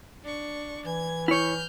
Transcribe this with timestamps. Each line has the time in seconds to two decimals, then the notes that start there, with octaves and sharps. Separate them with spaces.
0.24 D4 C#6
0.85 E3 G#6
1.28 E4 C#5 F6 G6